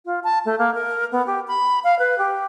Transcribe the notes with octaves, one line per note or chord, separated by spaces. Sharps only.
F4
A5
A3
A#3
A#4
B3
G4
B5
F5
B4
G4